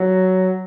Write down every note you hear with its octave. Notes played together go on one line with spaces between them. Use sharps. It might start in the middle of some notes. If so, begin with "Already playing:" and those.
Already playing: F#3